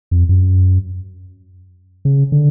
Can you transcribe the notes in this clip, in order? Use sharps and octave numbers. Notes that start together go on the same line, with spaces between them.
F2
F#2
C#3
D3